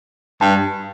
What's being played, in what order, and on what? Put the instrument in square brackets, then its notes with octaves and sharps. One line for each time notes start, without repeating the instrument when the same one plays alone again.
[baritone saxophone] G2 [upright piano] A5